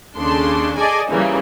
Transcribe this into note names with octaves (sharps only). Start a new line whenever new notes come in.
D#2 C#3 D4 A4 C6
G#4 A4 D5 D#5 G#5
A#2 C#3 E3 G3 A#3